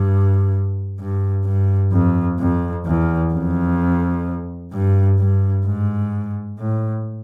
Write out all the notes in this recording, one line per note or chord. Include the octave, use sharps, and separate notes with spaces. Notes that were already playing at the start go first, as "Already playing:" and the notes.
Already playing: G2
G2
G2
F2
F2
E2
F2
G2
G2
G#2
A2